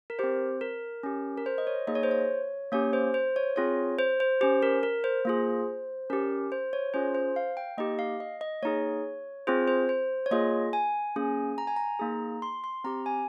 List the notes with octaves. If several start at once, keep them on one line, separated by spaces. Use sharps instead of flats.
A#4
C4 G4 C5
A#4
C#4 G4
A#4
C5
D#5
C#5
A#3 D#4 G#4 D#5
C#5
C5
C#5
A#3 C#4 G4 C#5
C5
C5
C#5
C4 F4 G#4 C#5
C5
C5
C#4 G4 C5
A#4
A#4
C5
A#3 F4 G#4
C#4 G4 A#4
C5
C#5
C#4 F4 G#4 C5
C5
F5
G5
A#3 D#4 G4 D#5
F5
D#5
D#5
A#3 D#4 G#4 C#5
C4 F4 G#4 C5
C5
C5
C#5
A#3 F4 G#4 D#5
G#5
A#3 C#4 G#4
A#5
G#5
A#5
A#3 D#4 G#4
C6
C6
C4 G4 A#5
G#5